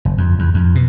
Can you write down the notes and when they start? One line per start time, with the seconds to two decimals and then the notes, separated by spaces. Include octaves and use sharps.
0.05 F#1
0.18 F2
0.39 E2
0.54 F2
0.75 B2